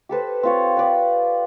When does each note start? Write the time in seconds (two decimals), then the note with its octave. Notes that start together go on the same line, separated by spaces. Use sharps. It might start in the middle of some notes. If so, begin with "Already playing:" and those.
0.09 G4 A4 B4 C5
0.43 C4 F4 C#5
0.77 B4 D5 G5